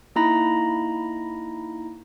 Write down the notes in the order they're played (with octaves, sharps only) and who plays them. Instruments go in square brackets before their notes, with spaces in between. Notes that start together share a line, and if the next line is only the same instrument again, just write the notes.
[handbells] A#3 D#4 E4 A#5 B5 A#6